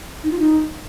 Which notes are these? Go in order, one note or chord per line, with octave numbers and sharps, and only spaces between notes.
D#4
F4
D#4